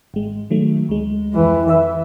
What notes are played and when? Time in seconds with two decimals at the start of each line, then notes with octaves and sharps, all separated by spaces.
0.14 G#1 G#3
0.50 D#3 F#3 A3
0.89 D2 G#3
1.33 F2 E3
1.68 E3 B4 E5 E6